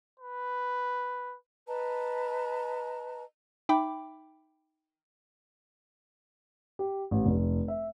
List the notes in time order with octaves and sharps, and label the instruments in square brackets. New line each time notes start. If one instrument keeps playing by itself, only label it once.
[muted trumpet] B4
[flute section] B4 D#5 A5 A#5
[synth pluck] D#4 E5 G5 B5 D6
[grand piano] G4
A1
F1
E5